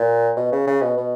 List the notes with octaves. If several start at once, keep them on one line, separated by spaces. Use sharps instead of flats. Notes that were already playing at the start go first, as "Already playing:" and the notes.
Already playing: A#2
B2
C#3
C#3
B2
B2